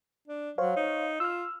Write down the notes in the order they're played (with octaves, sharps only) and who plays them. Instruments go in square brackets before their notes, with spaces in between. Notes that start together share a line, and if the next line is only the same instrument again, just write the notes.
[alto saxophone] D4
[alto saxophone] F#3 [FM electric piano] C5 C#5 F5
[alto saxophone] D#4
[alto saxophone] F4 [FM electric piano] E6 F6